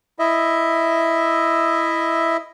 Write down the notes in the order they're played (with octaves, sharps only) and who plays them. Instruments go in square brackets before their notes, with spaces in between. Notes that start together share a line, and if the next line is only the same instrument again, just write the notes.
[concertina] E4 D#5 E5